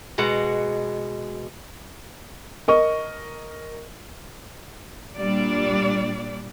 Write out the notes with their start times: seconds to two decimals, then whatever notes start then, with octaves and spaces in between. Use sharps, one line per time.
0.18 B2 G#3 F#5
2.68 A#4 D#5 C#6
5.18 A#2 G3 D4 D5